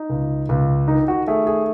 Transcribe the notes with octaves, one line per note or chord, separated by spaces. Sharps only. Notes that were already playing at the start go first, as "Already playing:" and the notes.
Already playing: D#4
C#2
C#2
D#3 D#4
F#4
A3 G#4
G#4